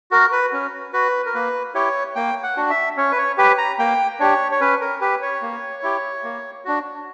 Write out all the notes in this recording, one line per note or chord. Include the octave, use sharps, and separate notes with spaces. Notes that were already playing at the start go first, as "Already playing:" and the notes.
F#4 A#4
B4
C#4
F#4 B4
A#4
A#3 B4
E4 G4 C#5
A#3 G5
F#5
D4 F#4
E5
C#4 C#5
B4
C#5
G4 B4
A#5
A#3 G5
D4 G4 C#5
C#5
C#4 B4
A#4
G4 B4
C#5
A#3
E4 G4
A#3
D4 F#4